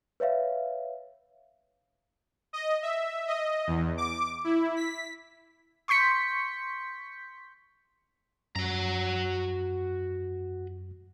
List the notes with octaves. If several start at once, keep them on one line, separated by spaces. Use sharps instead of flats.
B4 C#5 E5 F5
D#5
E5
D#5
E2
D6
E4
B6
C6 C#6 G6 B6 C#7
F#2 F#4 A#5